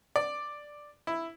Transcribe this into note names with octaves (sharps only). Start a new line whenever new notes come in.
D5
E4